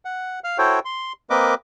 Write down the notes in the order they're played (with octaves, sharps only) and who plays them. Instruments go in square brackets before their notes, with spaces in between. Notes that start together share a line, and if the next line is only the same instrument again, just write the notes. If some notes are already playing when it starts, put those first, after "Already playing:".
[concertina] F#5
F5 F6
E4 F#4 A4 C5 C#5 G5
C6
A#3 C4 A#4 B4 D#5 D6